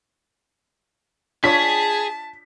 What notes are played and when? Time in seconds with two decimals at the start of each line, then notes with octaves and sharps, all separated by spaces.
1.44 D4 F4 G#4 C#5 A5 B6